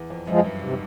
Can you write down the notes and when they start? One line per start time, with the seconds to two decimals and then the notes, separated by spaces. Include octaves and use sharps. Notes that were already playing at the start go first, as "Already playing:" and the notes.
Already playing: E2
0.10 F2
0.27 F#2 F3 G#3
0.44 G2
0.61 G#2 C3